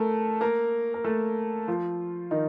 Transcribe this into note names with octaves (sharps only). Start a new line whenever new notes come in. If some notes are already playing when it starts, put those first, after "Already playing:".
Already playing: A3 A4 A#4
A#3 A#4
A#4
A3 A4
F3 F4
D#3 D#4